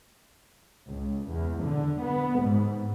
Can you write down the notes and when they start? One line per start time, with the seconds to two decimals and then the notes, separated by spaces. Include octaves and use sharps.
0.88 C#2
1.31 E2
1.62 D3
2.01 B3
2.43 G#2